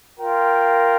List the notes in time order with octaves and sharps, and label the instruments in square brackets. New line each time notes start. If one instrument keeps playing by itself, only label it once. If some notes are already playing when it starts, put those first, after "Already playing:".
[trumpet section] F4 A#4 G5